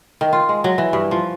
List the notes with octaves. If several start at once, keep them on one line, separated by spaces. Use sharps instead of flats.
D#3
F4
G#3
F#3
E3
G2
F3